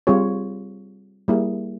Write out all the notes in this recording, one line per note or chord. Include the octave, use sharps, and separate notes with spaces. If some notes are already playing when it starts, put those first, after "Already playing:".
G3 C4 F4 G#4 C#5
G3 A#3 E4 G#4